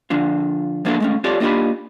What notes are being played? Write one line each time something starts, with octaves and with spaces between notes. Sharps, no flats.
D3 F3 D4 F4
F3 A#3 B3 D4 E4 A4
G#3 A3 C#4
C4 F4 G4 A4 C#5 D5
A#3 D4 D#4 F4 G4 B5